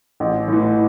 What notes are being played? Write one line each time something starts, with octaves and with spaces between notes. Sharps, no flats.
A1
A2 E3